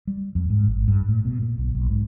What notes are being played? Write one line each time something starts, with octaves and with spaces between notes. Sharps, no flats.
G3
F2
G#2
G#1
G2
A2
B2
A#2
B1
B1
G#2